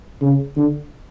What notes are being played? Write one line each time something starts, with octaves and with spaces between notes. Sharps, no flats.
C#3
D3